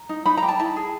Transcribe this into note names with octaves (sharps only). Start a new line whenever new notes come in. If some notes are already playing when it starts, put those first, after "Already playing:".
Already playing: A#5
D#4
D#4 B5
A#5
G4
A5
E4 A5
G#4